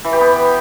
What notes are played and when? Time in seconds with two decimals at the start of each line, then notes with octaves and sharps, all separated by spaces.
0.05 E3
0.13 G4
0.21 B3